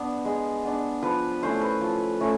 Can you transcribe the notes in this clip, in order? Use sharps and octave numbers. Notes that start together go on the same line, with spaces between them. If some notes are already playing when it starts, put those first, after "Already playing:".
Already playing: B3 D4
G#3
B3 D4
F3 B4
A3 C#4 E4 C5
B4
F3
A3 C#4 E4